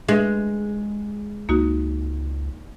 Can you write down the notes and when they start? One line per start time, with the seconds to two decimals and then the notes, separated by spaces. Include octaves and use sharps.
0.09 G#3 D4 B4
1.49 C#2 A#3 D#4 F#4